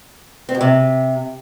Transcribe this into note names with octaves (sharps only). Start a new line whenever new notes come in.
C4
B2
C3